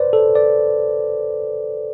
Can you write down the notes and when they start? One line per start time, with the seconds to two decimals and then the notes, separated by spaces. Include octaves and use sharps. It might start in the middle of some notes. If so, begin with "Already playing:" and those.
Already playing: B4 C5 D5
0.13 A4
0.35 D5